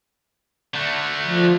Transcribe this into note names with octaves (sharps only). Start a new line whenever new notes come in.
D3 A3
F3